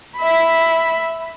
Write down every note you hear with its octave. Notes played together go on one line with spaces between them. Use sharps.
E5 B5